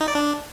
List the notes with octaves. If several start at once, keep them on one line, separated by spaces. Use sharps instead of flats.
D#4
D5
D4